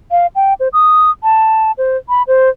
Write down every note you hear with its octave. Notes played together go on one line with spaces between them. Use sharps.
F5
G5
C5
D#6
A5
C5
B5
C5